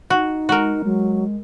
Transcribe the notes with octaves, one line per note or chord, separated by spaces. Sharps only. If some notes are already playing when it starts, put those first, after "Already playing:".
D#4 F#4
G#3 F#4 A#4
F#3 G#3